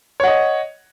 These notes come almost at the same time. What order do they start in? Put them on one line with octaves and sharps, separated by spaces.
C#5 F#5 D#5